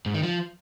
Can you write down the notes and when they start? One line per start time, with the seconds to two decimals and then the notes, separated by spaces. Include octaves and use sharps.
0.06 G#2
0.14 D#3
0.23 F3